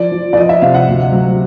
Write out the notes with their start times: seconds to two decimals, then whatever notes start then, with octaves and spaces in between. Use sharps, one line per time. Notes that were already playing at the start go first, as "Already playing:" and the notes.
Already playing: F3 D5
0.12 F3
0.33 D5
0.37 F3 D#5
0.49 E5
0.62 C3 F5
0.74 F#5
0.87 D2
1.12 F#3